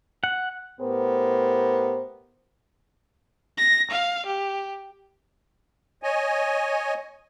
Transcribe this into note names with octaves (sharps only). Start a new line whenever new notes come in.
F#5
A2 B3 G4 A#4 C5
A#6
F5
G4
C#5 D#5 G#5